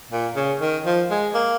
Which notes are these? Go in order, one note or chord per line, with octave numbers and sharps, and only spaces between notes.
A#2
C#3
D#3
F3
G#3
A#3